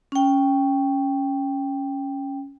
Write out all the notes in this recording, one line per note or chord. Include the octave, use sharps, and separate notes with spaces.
C#4 G5